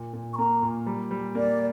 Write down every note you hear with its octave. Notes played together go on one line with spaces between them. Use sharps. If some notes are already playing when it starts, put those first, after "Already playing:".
Already playing: A#2
A#2
C#6
A#3 A#5
A#2
G3
G3
A#3 D5